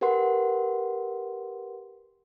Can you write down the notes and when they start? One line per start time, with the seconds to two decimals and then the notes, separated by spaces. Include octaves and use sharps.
0.01 G4 A#4 B4 F#5 C6